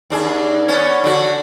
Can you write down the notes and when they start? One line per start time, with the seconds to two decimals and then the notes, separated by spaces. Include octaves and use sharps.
0.10 D#2 D4 G#4
0.68 B3 C#4 C#5
1.04 D3 D4 F#4